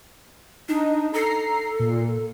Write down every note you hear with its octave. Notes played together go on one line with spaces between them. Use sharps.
D4 D#4
A4 A#5 C7
A#2